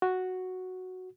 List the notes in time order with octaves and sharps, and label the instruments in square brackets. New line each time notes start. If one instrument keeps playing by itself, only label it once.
[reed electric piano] F#4